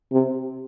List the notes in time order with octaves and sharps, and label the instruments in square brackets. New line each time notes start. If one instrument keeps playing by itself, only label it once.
[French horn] C3